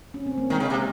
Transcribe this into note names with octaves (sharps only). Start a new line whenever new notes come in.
C#4
C4
A#3
D#3 G#3
C#3
C3